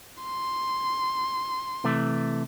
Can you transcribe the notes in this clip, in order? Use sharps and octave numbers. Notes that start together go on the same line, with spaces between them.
C6
C3 E3 A3